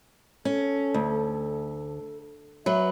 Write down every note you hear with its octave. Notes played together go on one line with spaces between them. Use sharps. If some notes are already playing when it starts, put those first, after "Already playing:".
C#4 A4
D2
F#3 B4 E5